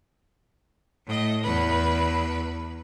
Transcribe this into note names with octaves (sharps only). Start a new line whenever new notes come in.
A2 D#5
E2 B4